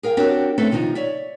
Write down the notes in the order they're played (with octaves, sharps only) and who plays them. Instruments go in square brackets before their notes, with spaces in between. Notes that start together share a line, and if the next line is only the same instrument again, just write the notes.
[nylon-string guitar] G#4 A#4 F5 G5
C4 D4 F#4 G4 A#4 C#5
A3 C4 C#4 A4 B4 E5
C3 D#3 F3 D#4 F4
C#5 D5 E5